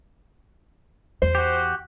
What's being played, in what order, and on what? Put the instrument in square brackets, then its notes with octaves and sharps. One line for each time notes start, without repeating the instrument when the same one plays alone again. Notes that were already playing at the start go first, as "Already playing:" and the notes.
[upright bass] E2 [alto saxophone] C5
[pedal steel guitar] F#4 G4